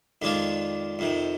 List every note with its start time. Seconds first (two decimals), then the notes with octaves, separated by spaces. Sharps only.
0.22 F2 D#3 G#3 D4 F4
0.99 F2 C3 D#3